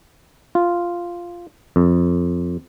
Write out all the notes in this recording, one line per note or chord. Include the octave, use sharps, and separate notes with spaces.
F4
F2